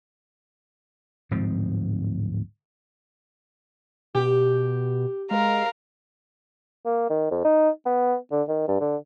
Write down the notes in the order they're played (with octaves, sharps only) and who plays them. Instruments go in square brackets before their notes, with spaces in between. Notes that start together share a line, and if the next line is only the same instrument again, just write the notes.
[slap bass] D1 G#2 F3 C4
[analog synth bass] B2 [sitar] G4
[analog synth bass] G#3 [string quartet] A#4 F5
[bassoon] A#3
D#3
F2
D#4
B3
D3
D#3
G2
D3